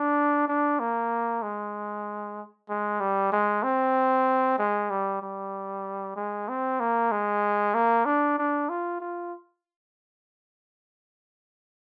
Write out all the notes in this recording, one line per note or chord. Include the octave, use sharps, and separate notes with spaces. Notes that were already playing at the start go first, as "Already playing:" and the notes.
Already playing: D4
D4
A#3
G#3
G#3
G3
G#3
C4
G#3
G3
G3
G#3
C4
A#3
G#3
A#3
D4
D4
F4
F4